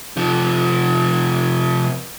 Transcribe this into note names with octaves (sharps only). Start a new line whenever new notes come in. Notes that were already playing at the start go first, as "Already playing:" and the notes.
C3 F3